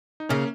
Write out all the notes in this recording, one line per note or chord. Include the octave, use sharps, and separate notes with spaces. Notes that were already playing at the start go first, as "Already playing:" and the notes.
D#4
C#3 A#3 C#4